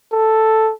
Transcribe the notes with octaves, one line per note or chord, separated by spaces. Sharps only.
A4